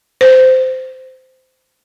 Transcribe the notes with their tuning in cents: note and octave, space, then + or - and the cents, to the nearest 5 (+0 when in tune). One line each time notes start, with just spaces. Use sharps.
C5 -15